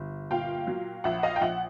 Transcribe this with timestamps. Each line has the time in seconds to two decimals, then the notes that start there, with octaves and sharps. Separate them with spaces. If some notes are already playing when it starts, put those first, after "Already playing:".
Already playing: G1
0.31 A#2 F5 G5
0.67 F#3
1.04 A#1 E5 F#5
1.23 D#5 F5
1.36 G5
1.41 A#1 E5 F#5